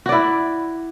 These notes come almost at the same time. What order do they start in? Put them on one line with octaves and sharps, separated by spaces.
F#4 D5 E4